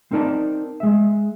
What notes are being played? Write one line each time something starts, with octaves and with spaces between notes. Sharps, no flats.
C4 D#4 A#4 D5 A5
G#3 E5